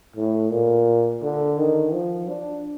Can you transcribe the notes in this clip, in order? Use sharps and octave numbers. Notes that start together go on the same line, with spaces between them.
A2
A#2
D3
D#3
F3
D4